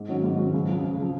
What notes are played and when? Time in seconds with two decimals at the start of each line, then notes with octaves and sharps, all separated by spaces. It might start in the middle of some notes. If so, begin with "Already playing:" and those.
Already playing: G#2
0.08 D#3 F#3 C#4 F#4
0.24 G#2
0.39 D#3 F#3 C#4 F#4
0.54 C#2
0.69 C#3 F3
0.84 C#2
0.99 C#3 F3